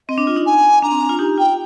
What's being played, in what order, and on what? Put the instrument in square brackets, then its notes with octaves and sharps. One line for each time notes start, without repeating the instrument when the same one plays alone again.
[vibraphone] C4 [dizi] D#5
[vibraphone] D4
F4
D#4
[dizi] G#5
[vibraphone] D4 [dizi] A#5
[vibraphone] C4
D4
F4
D#4 G4
[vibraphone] F4 [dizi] G5